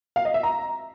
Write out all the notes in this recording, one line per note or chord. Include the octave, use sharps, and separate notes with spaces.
F5
D#5
E5
A#5